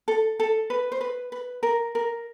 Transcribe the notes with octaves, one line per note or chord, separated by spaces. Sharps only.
A4
A4
B4
C5
B4
B4
A#4
A#4